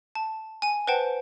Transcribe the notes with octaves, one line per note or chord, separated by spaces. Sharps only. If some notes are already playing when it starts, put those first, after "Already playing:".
A5
G#5 D#7
B4 C5 F#5 G5 A5